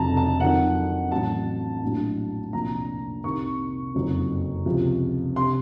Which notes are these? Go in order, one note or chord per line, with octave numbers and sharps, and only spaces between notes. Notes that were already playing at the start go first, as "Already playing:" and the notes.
Already playing: F1 F2 C#3 F#3 A5 A#5
A5
F2 D#3 F#3 F#5
A1 A2 F#3 A5
A#1 A2 F#3
C2 A#2 F3 A#5
C2 C3 D#3 C#6
F#1 F2 D#3 F#3
C#2 C3 F3
C3 C6